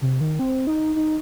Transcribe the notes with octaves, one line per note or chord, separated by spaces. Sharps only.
C3
D#3
C4
D#4
D#4